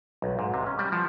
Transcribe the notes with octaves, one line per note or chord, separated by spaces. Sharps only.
B1
G#2
C3
C#4
G3
F3